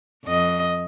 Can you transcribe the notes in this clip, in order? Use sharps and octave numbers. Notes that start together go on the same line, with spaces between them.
F2 D#5